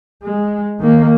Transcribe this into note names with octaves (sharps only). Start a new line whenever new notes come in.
G#3
D#3 A#3